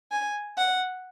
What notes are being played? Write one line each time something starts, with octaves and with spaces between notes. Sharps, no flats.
G#5
F#5